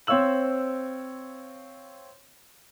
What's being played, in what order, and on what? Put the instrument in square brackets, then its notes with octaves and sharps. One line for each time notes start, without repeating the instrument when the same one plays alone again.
[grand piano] C4 C5 C#5 F5 E6 F#7